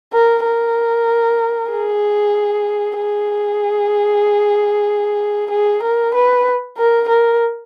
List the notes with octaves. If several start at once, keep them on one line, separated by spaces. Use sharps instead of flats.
A#4
A#4
G#4
G#4
G#4
A#4
B4
A#4
A#4